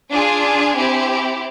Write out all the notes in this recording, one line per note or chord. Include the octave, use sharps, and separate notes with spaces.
D4 F4 G#4 G#5
C4 E4 G4